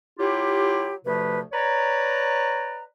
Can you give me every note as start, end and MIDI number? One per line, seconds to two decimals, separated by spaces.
0.18 0.93 54
0.18 0.93 64
0.18 0.93 65
0.18 0.93 67
1.05 1.39 38
1.05 1.39 48
1.05 1.39 53
1.05 1.39 57
1.05 1.39 71
1.53 2.83 71
1.53 2.83 73
1.53 2.83 74
1.53 2.83 82